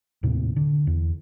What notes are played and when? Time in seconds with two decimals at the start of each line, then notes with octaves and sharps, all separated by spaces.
0.23 D#2 A2 C3
0.56 D3
0.87 E2